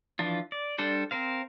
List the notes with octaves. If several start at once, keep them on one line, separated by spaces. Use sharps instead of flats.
E3 F3 D4 F4
D5
G3 D4 A4 C5
C4 A#4 C5 F5